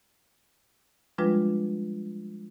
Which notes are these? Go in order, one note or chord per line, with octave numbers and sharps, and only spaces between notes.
F3 G3 G#3 D4 F4 B4